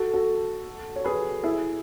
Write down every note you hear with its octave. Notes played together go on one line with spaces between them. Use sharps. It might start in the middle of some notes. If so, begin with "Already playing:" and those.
Already playing: F#4 A4
F#4 A4
C#5
G#4 B4
E4 G#4